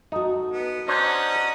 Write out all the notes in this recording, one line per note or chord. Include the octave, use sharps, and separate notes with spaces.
D#4 F#4 A4
B3
C#4 D4 C5 C#5 D#5 F#5 A#5